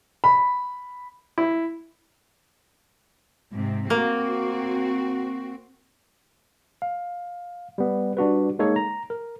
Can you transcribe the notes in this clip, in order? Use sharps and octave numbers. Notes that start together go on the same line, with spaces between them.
B5
E4
G#2 C3
A#3 C4 F#4
F5
G3 B3
G3 D4 F#4 B4
G#3 A#3 D#4 A4 C#5
A#5
A#4